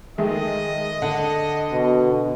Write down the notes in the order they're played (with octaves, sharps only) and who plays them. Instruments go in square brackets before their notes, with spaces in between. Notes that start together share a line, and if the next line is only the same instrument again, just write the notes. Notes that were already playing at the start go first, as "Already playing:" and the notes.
[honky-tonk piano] D#3 G#3 A3 [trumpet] D#5
[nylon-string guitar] D3 [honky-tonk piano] F#5
[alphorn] B2